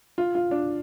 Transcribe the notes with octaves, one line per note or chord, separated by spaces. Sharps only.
F4
F4
D4